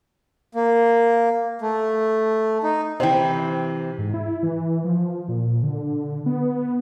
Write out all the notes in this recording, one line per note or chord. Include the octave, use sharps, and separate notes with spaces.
A#3
A3
D#4
C3 E3 C5 G5
G#2
E4
E3
F3
A#2
D3
B3